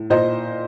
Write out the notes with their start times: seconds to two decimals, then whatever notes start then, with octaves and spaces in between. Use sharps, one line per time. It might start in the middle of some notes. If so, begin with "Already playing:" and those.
Already playing: A2
0.10 A#2 C5 D#5